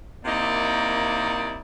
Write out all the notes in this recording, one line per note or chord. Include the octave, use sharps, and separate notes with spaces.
C3 D#3 A#3 D#4 E4 D5